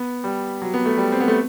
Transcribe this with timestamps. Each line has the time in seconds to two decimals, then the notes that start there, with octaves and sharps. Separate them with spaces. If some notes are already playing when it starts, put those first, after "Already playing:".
Already playing: B3
0.24 G3
0.62 F#3
0.74 B3
0.86 A3
0.98 G3
1.12 C4
1.20 B3
1.28 A3